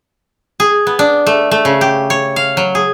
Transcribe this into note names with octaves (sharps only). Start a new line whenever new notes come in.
G#4
B3
D4
A3
A3
C#3
G4
C#5
F5
F#3
G#4